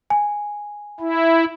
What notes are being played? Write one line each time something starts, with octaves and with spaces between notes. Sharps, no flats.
G#5
E4